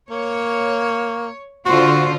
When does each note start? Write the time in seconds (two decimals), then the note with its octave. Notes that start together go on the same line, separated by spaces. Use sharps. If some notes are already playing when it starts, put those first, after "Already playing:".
0.10 A#3 C#5
1.66 D3 F4 F#4 C5